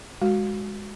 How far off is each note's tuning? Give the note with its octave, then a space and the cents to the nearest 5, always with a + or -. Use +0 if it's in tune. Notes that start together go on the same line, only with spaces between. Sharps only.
G#3 -15 F#4 +0